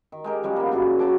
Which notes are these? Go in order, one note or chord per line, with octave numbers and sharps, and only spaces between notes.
D#3
G#3 G4 A#4
F3 G3 G#3 C#4
A#3 B3
F#2 C#3 D4 G#4
F#3 G5 A5 D6